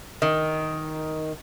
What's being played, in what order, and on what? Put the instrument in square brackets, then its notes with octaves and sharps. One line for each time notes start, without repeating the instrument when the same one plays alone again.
[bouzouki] D#3